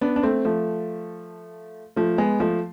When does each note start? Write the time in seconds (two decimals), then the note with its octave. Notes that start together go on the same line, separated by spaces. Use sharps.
0.01 B3 D4
0.16 D4
0.23 A3 C4
0.45 F3 A3
1.96 F3 A3
2.18 G#3 B3
2.40 F3 A3